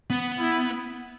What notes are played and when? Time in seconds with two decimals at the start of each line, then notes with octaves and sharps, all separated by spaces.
0.10 B3
0.39 E4